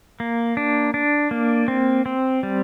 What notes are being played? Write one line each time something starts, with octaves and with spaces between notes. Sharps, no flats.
A#3
D4
D4
A#3
C4
C4
G3